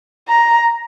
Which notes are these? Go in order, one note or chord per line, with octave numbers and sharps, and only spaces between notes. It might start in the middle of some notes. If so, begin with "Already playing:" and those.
A#5